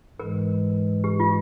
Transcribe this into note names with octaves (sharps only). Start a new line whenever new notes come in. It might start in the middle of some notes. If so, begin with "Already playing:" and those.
G#2 E3 G#3 A#4
G4
F4